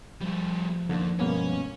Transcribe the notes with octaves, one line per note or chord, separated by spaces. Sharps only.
F3 G3 A3
F2 D3 D#3 A#3
G2 B2 G#3 A#3 B3 C#4